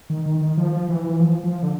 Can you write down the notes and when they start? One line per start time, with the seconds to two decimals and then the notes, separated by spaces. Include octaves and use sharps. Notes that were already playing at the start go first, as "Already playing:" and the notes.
0.10 D#3
0.26 D#3
0.41 D#3
0.57 F3
0.72 F3
0.89 E3
1.04 E3
1.20 F3
1.44 F3
1.63 D3